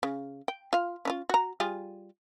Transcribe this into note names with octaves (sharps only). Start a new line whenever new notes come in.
C#3
G5
F4 F5
C#4 D#4 F4
F#4 A#5
G3 F4 G#4